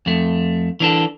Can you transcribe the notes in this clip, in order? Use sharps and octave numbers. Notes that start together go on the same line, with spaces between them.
F2 A3
E3 D4 A4